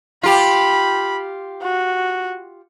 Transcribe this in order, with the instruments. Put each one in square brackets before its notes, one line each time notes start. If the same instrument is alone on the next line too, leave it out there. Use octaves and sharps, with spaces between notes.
[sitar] F4 G4 [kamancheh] B5
[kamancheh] F#4